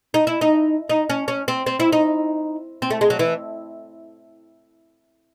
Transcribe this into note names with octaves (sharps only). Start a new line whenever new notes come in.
D#4
E4
D#4
D#4
C#4
C#4
C4
C4
E4
D#4
C4
A3
G#3
F#3
E3